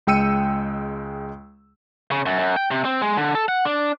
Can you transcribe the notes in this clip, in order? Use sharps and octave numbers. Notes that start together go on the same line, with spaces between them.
C#2 G#3 G5 E6 C#7 D#7
C#3
F#2
F#2
G5
C3
C4
G#3
D3
A4
F#5
D4